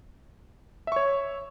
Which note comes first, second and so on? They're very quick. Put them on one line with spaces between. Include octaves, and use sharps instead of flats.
E5 C#6 C#5